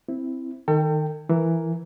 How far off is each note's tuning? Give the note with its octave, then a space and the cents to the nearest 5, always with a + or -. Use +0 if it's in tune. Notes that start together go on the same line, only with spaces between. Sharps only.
C4 +0 E4 +0
D#3 +0 A4 +40 G5 +0
E3 +5 A#4 +0